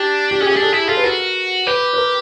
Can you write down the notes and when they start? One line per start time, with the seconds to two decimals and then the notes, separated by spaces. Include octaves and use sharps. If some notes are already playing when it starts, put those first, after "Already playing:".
Already playing: D4 G4
0.31 G4
0.40 C#4 G#4
0.46 G4
0.52 G#4
0.56 D4
0.62 A4
0.73 E4 G#4
0.88 F4 A4
0.97 B4
1.03 F#4 A#4
1.67 G4 B4
1.93 B4
1.98 A#4